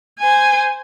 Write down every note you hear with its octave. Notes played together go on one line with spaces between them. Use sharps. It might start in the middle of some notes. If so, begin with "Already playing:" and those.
C5 G#5